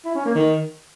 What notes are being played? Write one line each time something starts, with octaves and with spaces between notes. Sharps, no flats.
E4
C#4
A#3
D#3